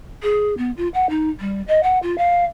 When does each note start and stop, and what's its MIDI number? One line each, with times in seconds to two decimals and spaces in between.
0.22 0.54 68
0.57 0.71 59
0.77 0.88 65
0.94 1.07 78
1.09 1.29 63
1.40 1.62 55
1.67 1.81 75
1.83 1.99 78
2.03 2.16 65
2.18 2.45 77